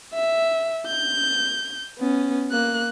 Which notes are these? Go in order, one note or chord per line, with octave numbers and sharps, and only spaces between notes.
E5
G6
B3 C#4
A#3 F#6